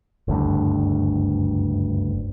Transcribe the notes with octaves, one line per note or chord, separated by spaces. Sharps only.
F#1 D2 G2